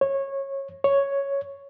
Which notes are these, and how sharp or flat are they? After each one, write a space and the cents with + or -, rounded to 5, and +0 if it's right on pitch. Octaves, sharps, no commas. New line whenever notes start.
C#5 -20
C#5 +0